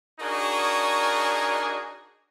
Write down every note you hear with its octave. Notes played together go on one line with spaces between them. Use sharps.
D4 D#4 F#4 G#4 A#4 C#5